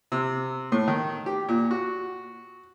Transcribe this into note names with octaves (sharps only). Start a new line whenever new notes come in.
C3
A2
D#3
G4
A#2
F#4